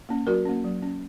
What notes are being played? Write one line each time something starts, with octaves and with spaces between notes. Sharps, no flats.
A#3 C#4
F#3 F#4 A#4
A#3 C#4
F#3
C#4